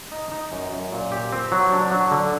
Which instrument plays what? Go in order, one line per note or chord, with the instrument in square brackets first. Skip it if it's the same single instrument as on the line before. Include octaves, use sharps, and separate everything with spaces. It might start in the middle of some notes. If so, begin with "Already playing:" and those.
[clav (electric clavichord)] D#4
D#4
F#2
F#2
A#2
G4
C4
F#3
D4
F#3
D3